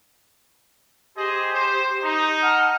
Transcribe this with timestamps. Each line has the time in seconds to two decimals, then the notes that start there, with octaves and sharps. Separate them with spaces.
1.17 G4 G#4 C5 D#5 C6
1.54 C5
2.03 D#4
2.42 F#5 A5 F6